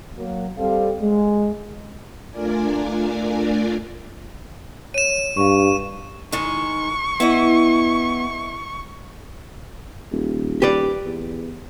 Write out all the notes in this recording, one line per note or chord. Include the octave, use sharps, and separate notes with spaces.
F#3 A#3
G3 C4 A4 F5
G#3
A3 D4 F4 A#4 D5 G#5
C#5 D#7 E7
G2 F5 C#6
D#3 G#3 C#6
B3 E4 D#5
D#1
G4 B4 D5
E2